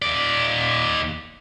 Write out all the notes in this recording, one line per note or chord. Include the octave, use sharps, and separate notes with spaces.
D#2 D5